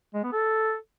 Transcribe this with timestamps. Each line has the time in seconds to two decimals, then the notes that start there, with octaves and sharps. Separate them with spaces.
0.15 G#3
0.24 B3
0.33 A4